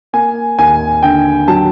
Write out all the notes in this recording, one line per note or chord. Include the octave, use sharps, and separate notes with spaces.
A#3 G#5
D#2 G#5
D3 G5
F#3 A5